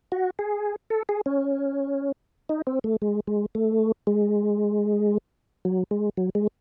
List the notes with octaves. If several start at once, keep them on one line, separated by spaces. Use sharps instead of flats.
F#4
G#4
A4
G#4
C#4
D#4
C4
A3
G#3
G#3
A3
G#3
F#3
G#3
F#3
G#3